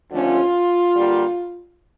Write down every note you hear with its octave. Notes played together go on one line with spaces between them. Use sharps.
D#2 D3 F3 A3 C#4 F4
D3 G3 A#3